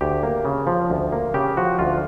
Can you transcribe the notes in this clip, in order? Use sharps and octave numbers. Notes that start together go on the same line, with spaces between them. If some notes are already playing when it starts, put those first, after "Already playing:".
D2 G4
A#3
C#3
F3
D2
A#3
C#3 G4
F3 F#4
D2 F4